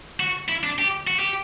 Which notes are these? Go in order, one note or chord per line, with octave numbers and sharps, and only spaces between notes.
F#4
E4
D4
G4
F#4
G4